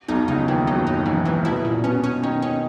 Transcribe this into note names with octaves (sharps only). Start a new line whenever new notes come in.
B1 B2 D#4
C#2 C#3 D#4
D#2 D#3 E3
F#2 F#3 D#4
D#4
G#2 E3 G#3
E3
A#3
B2 B3 E4
A#2
B2 B3 C#4
C#4
D#3 C#4 D#4
C#4